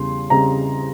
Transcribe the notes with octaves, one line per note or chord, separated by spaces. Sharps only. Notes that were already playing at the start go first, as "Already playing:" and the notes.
Already playing: E2 C#3 G3 C6
C#3 G3 C4 A#5